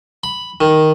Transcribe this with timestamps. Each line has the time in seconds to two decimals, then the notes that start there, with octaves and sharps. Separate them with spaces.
0.24 B5
0.61 D#3